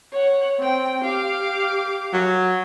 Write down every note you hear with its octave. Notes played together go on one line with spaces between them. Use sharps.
C#5 F#5
C4 G5
G4 F5 D6
F#3